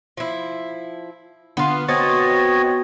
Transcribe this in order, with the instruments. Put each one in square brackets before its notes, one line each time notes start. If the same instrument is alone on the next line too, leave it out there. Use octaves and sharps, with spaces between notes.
[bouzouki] F3 E4
[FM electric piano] D3 C6 [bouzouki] B3 F4
[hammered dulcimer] B2 [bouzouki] B3 C4 [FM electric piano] C5 C#6 A6 [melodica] C#5 D#5